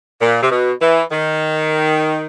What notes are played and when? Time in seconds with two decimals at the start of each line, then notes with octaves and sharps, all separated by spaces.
0.21 A#2
0.43 C3
0.51 B2
0.82 E3
1.12 D#3